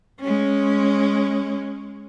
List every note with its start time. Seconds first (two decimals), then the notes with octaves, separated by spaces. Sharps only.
0.20 G#3 C#4